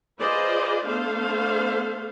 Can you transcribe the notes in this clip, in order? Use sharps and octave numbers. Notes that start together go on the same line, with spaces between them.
F4 G#4 B4 C5 D5 D#5
A3 B3 D4 A4 C5 F5